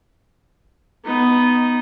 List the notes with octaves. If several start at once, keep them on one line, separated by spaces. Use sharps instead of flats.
B3 D#4